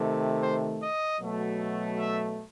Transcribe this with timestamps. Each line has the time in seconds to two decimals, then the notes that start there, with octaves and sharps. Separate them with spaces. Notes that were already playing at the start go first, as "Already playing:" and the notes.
Already playing: C3 D#3 A3
0.43 C5
0.82 D#5
1.20 B2 F#3 A3
1.97 E5